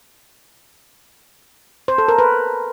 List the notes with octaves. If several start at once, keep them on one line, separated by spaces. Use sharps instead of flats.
C5
A4
A#4
B4